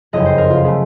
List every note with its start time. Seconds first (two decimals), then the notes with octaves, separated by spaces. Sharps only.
0.13 F#1 F2 C#3 D#5
0.26 C5
0.38 A#4
0.50 F4
0.65 C#3 A3